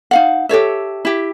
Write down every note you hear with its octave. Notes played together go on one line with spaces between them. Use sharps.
D#4 F5 F#5
G4 A4 C#5 E5
E4 G4